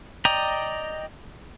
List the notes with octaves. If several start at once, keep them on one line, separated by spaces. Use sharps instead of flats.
D5 D#5 G5 A#5